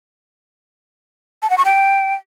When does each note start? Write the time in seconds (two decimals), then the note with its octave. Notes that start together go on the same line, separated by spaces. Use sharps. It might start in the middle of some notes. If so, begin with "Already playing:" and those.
1.43 A5
1.50 F#5
1.58 C#6
1.65 G5